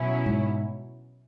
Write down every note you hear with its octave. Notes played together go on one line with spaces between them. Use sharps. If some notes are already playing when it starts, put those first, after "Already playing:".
Already playing: B2 F#3 C#4 E4
G#2